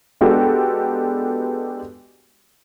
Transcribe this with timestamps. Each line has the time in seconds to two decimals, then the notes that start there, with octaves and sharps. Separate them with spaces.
0.21 G#3 B3 D4 F#4 G4 A4